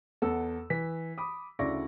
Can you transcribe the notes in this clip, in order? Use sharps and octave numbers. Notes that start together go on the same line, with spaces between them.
E2 A4 F#5 E6
E3 B6
B5 D6 D#6
D2 C#3 E4 D5 C#6 A#6